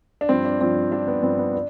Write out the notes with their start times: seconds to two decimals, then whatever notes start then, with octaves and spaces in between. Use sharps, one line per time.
0.21 D4
0.29 G2 F3 C4
0.45 D4
0.61 G2 F3 C4
0.91 G2 F3 D4
1.08 B3
1.23 G2 F3 C4
1.39 B3
1.54 D4